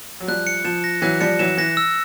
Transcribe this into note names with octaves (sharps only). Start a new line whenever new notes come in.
F#3
F3 G3 F#6
C#7
F3 E7
A#6
E3 F#3 F#6
F3 G3 C#7
E3 F#3 E7
E3 A#6
E6